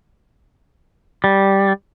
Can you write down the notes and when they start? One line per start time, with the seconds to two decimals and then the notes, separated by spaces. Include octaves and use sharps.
1.24 G3